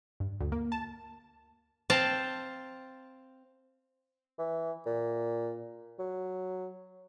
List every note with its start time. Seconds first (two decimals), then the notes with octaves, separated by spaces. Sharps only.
0.20 G2
0.40 D2
0.52 A#3
0.72 A5
1.90 C4 F5 G5 A5
4.39 E3
4.86 A#2
5.99 F#3